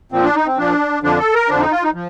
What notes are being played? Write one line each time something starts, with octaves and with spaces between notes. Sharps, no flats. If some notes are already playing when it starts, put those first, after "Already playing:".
A#2 F3 C4
D4
D#4
C4
A#2 F3 D4
F2 D3 F3 D4
A4
A#4
F2 D3 F3 D4
D#4
F4
D#4
F3